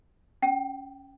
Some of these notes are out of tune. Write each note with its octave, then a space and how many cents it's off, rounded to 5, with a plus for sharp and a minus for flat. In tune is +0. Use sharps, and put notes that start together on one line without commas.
C#4 +0 G5 +0